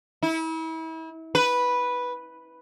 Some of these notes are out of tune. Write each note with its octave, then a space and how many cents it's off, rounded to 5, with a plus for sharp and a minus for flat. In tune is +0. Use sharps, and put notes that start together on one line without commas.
E4 -35
B4 -5